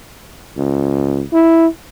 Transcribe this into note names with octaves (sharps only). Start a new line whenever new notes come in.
C#2
E4